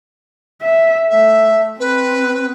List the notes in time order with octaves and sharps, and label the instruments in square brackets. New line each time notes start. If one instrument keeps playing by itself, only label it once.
[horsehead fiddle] E5
[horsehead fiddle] A3 [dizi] E5
[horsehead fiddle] C4 [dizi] B4